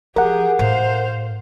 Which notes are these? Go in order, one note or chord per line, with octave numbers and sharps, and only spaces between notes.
F3 G4 G#4 A#4 F#5
A2 C5 F5